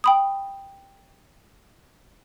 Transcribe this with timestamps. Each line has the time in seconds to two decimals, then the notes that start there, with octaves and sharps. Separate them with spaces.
0.04 G5 B5 D#6